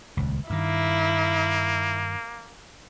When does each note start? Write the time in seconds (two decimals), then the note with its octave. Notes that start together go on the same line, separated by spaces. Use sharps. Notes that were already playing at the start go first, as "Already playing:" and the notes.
0.17 D#1 C#2
0.50 G2 D#3 A#3 E4